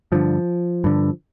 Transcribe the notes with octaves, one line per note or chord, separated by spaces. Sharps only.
G2 D3 F3
G2 D3